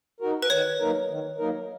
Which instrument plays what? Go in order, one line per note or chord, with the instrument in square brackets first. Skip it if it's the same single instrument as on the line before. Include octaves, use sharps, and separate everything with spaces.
[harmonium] D#4 F#4 A#4
[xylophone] B4
[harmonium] D#3 [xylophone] C#5
[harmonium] F#3 A#3 D#4 A#4
D#3
F#3 A#3 D#4 A#4